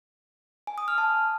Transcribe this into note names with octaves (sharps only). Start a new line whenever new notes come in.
G#5
D#6
F6
A5